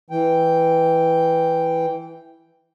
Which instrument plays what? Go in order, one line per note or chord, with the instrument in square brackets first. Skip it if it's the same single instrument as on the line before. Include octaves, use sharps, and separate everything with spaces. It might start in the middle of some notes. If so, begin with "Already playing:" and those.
[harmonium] E3 G5